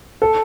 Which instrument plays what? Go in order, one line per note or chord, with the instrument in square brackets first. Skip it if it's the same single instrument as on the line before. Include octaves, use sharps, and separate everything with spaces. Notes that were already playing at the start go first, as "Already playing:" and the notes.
[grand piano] A4